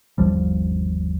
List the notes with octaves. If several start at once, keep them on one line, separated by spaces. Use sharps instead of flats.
G1 D#2 F3 G3